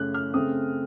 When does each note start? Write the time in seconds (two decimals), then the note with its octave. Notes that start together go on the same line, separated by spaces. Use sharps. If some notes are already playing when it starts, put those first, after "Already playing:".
Already playing: F#2 C#3 A3 C#4 F#6
0.14 F6
0.34 C#3 A3 C4 D#6